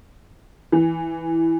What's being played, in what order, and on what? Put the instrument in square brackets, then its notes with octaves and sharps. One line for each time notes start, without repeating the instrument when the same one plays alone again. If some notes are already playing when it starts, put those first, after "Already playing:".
[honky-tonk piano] E3